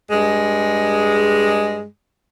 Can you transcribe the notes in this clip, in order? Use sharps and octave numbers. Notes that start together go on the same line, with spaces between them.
G2 G#3